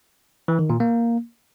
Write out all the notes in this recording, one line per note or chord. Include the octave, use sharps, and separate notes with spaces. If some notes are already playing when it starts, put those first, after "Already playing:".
E3
D#3
A#2
A#3